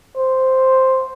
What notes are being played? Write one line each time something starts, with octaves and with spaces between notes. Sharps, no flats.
C5